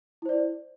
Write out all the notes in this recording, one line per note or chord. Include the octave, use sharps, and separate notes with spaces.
E4 C5 D5